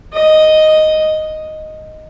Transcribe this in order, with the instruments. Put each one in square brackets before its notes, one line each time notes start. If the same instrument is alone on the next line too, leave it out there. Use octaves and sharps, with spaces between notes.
[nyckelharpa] D#5